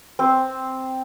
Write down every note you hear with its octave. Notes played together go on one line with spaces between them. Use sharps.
C4